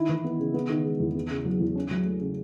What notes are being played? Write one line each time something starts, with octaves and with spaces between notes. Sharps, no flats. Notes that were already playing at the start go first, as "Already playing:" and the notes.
Already playing: D#3 E4
E3
B3
C#3
B3
D#3
G#3
E2
B3
C#3
F#3
E2
C#4
F#3
A3
C#3